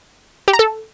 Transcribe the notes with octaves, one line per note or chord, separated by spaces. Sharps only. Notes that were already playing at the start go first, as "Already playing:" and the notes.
G4
A#5
A4